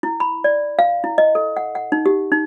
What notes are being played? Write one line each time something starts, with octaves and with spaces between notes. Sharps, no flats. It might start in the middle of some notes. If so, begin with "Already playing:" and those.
E4
B5
D5
F5
E4
D#5
A4
F#5
F#5
D#4
G4
D#4